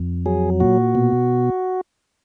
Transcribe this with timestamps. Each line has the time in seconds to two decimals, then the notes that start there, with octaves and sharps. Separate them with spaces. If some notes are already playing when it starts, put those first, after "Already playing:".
Already playing: F2
0.26 F#3 G#4
0.60 A#2 F#4
0.95 B2